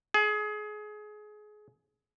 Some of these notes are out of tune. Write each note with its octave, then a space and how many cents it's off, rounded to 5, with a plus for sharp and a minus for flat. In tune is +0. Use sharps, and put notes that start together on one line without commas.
G#4 +25